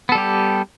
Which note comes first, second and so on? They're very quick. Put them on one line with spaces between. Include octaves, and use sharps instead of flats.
B3 A4 G3 G4